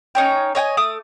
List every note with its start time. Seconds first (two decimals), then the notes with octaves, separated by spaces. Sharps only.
0.15 C#4 D#4 C#5 G5
0.55 C#5 D#5 G5 G#5
0.77 A3 D6 D#6